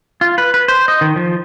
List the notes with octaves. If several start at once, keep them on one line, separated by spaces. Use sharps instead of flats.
F4
B4
B4
C5
D#5
D#3
F3